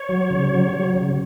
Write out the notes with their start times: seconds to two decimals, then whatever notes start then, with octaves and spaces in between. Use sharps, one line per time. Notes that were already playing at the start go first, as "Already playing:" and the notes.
Already playing: C#5
0.09 F#3
0.30 C#3
0.52 F#3
0.73 F#3
0.93 C#3